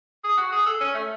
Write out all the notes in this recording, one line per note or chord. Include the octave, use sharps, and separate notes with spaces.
G#4
F#4
G#4
A4
C#4
A3